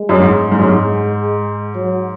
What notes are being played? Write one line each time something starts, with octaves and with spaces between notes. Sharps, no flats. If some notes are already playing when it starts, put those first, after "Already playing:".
Already playing: G#3
F#2
G#2
G#2
F#2
G#2
F#3